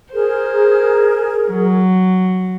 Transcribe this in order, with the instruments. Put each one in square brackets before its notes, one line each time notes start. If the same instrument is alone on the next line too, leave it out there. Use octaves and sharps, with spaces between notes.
[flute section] G#4 A#4 [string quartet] C5
[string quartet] F#3